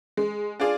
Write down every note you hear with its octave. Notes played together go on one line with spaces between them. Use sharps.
G#3
D4 F4 G#4 D5